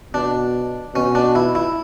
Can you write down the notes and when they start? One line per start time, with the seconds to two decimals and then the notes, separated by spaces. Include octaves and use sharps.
0.14 B2 D4
0.95 B2 C#4
1.15 D4
1.35 E4
1.55 E4